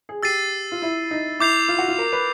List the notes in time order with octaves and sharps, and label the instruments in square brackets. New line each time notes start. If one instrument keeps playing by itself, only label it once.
[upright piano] G#4
[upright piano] G4 [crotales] E6 A6 C7 D#7
[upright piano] F4
E4
D#4
[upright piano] E4 [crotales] D6 G6 C7 F7
[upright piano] F4
F#4
F4
A#4
B4